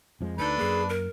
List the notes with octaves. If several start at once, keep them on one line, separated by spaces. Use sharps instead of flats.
F2 F3 G#3
D2 D4 D#4 A4 B4
F#2 A#3 G#4
A#4